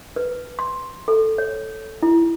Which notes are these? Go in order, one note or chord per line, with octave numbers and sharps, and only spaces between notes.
B4
C6
A4
C#5
E4